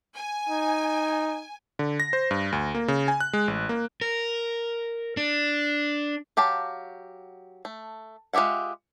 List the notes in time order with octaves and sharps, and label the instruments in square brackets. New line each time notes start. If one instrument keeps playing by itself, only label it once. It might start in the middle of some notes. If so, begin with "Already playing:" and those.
[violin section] G#5
[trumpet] D#4
[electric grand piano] D3
A#6
C5
G2
D2
A#3
C#3
G#5
F#6
G#3
A1
A#3
[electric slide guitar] A#4
D4
[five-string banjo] F#3 G4 F5 A5
A3
G#3 F4 G4 E5 F#5